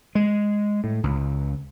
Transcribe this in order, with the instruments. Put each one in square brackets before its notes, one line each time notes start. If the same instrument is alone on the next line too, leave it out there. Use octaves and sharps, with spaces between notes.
[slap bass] G#3
A2
C#2